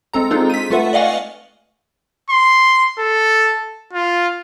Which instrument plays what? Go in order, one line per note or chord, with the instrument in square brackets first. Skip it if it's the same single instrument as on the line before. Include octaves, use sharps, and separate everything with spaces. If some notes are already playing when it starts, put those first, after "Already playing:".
[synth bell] G#3 C4 A4 A#5
C4 D4 D#4 F4 G#4 A4
B6 D#7
A3 F4 A4 B4 E5 F#5
D5 D#5 F5 F#5 G#5 C#6
[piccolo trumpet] C6
A4
F4